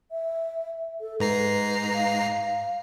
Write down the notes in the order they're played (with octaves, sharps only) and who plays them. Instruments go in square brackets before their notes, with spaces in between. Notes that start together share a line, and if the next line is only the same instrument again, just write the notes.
[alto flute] E5
A4
[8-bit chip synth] G#2 A#5 C7 [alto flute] B4
[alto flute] F5